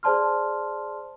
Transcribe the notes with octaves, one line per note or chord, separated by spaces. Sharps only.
G#4 C5 D5 A5 C6 F6